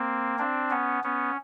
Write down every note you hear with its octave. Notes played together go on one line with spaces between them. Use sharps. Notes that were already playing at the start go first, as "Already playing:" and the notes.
Already playing: A#3 C4
C4 D4
B3 C#4
B3 C#4